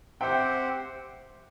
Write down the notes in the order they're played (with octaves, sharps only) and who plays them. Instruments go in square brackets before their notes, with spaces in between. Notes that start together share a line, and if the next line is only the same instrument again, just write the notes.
[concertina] C4 G4 C5 F#5 [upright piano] E5 G5